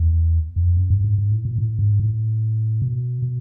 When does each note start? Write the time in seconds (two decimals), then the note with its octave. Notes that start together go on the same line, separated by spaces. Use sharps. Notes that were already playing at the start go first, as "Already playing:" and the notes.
Already playing: E2
0.56 F2
0.77 F#2
0.90 G2
1.04 G#2
1.18 G#2
1.32 A2
1.45 A#2
1.58 A2
1.79 G#2
1.99 A2
2.82 B2
3.22 B2